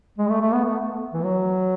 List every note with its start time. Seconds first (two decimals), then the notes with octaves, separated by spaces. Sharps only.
0.18 G#3
0.29 A3
0.41 A3
0.53 B3
0.65 A3
1.13 E3
1.24 F#3